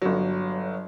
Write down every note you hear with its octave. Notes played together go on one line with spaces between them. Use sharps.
G1 F#3